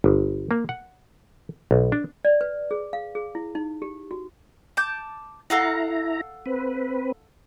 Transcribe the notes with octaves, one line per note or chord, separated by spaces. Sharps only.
G1
A#3
F#5
B1
D4
D5
B4
G#4
F5
G#4
E4
D#4
G4
F#4
A5 D6 G6
E4 A4 F5 F#5 A#5
C4 B4